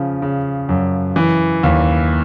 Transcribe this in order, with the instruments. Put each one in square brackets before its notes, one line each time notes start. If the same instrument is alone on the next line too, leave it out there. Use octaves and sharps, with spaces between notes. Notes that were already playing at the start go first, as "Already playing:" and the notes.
Already playing: [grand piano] C#3 F3
C#3
F#2
E3
D#2